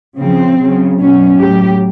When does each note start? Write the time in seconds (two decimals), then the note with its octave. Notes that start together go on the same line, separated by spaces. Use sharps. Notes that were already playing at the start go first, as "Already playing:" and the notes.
0.17 C#3 F3 C4
0.59 C#3 F#3
0.99 B2 F#3 C#4
1.40 A2 F#3 G4